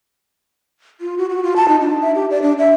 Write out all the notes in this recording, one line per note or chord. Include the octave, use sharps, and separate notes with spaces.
F4
F#4
F#4
F4
A5
D#4
D4
E5
G4
D5
D4
E5